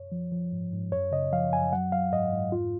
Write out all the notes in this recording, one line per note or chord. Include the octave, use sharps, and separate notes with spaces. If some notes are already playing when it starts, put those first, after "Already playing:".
Already playing: F#2 C#5
F3
F3
G#2
G#2
F#2 C#5
C#3 D#5
F3 F5
F#2 G#5
F#3 F#5
F#3 F5
G#2 D#5
G#2
F2 F4